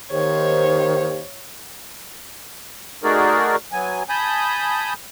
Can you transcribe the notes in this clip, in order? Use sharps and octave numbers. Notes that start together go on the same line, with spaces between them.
D#2 D#3 G4 C5 C#5
A3 D#4 F#4 G#4 A#4 D5
F#3 B3 G#5
G#5 A5 B5 D#6 G6